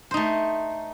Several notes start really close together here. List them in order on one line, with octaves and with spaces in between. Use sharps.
C5 D#4 A3